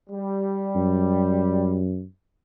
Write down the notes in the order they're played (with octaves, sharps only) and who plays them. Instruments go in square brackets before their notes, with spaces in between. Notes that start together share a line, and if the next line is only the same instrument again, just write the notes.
[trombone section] G3
[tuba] F#2